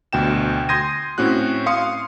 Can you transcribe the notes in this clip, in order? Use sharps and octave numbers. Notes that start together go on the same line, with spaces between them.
D2 B2 G5 E7
C6 D#6 G6 G#6 A#6 D#7
A2 C4 C#4 F#4 F#6
F5 C6 D#6 C#7